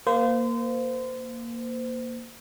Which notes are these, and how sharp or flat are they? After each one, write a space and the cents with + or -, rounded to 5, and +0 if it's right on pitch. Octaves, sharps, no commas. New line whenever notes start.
A#3 +0 C5 -30